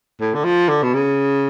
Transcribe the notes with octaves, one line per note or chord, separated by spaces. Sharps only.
A2
D3
F3
D3
B2
C#3